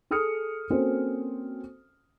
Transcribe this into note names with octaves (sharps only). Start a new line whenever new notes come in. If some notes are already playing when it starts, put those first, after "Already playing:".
G#4 A4 D#6 F6 C#7
A#3 C4 C#4 F#4 A4 C5